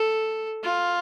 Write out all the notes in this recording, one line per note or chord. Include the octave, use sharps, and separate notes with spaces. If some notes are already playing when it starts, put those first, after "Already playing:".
Already playing: A4
F4